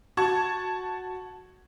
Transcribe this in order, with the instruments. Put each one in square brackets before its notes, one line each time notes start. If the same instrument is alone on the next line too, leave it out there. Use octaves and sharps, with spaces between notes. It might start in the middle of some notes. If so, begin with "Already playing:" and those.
[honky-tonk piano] F#4 A5 C#6 G#6